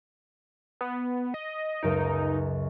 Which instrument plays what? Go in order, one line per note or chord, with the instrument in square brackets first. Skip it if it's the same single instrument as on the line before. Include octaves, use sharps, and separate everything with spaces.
[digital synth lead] B3
D#5
[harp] C#2 F#2 D7 [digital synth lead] D#4